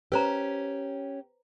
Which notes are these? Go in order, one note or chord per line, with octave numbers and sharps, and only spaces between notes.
C#4 G4 B4 C5 A#5